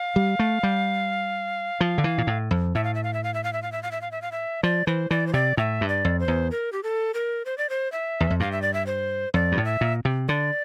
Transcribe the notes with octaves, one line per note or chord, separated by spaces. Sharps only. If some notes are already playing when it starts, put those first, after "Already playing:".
Already playing: F5
G3
A3
G3
F3
D3
E3
A#2
A2
F2
A2 E5
F5
E5
F5
E5
F5
E5
F5
E5
F5
E5
F5
E5
F5
E5
F5
E5
F3 D5
E3 C5
E3 D5
C5
C3 D5
A2 E5
G2
D5
F2
C5
E2
A#4
G4
A4
A#4
C5
D5
C5
E5
E2
F2
G2 F5
E5
D5
E5
C5
F2 D5
G2
A2
E5
A#2
C3
D3 D5